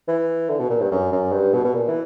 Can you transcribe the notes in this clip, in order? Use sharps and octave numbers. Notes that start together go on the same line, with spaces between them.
E3
D3
B2
A#2
G2
F#2
F#2
G2
B2
B2
A#2
E3